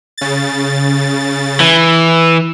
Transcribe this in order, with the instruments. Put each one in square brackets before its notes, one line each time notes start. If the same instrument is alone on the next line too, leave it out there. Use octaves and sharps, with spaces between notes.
[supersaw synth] C#3 A6
[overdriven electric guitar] E3